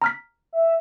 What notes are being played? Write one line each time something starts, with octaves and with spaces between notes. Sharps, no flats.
A#5 F6 B6
E5